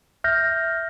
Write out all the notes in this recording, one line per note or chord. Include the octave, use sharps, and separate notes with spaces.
E5 F6 G6 A#6